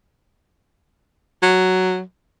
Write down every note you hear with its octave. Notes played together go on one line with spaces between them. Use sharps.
F#3